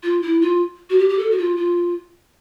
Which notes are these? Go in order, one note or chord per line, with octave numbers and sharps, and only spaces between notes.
F4
E4
F4
F#4
G4
G4
A4
F#4
F4
F4